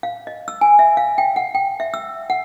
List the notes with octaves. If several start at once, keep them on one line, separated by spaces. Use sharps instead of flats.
F5
D#5
E6
G#5
E5
F5
G5
F#5
G5
E5
E6
F#5